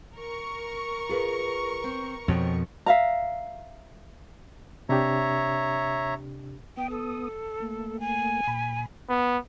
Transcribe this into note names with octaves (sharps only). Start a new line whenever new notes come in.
A#4 C#6
F4 G#4 B4
C4
F2 B2 F3 C#5 G5
E5 F5 A#5
C3 D4 G4 C#5 E5 A#5
B3 G5 D#6
A4
A3 A#3
G#5
A#2 B5
B3